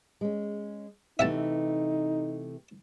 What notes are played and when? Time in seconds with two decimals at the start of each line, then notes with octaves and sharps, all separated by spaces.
0.21 G#3 C#4
1.19 C3 E3 A3 D#4 E5 F#5 A5